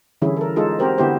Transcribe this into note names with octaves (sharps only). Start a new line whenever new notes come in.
D3 E3 G3 C#4 E4 G#4
A4 A#4
G#3 D#4 F4 G#4 A4
C4 F#4 G4 A#4 C5
D3 B3 E4 F#4 G4 C5